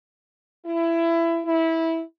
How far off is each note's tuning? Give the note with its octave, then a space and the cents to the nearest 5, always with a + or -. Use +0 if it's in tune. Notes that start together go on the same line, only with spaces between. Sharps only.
E4 +20
E4 -15